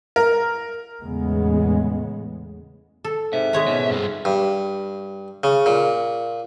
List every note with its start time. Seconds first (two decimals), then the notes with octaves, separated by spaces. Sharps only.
0.16 A#4
1.02 E2 A2 C#3 G#3 B3
3.04 A4
3.33 G#2 C3 E5
3.53 G#3 C#5 A#5
3.65 C#2 G#2 B2
3.90 G2 C4
4.25 G2
5.44 C#3
5.66 A#2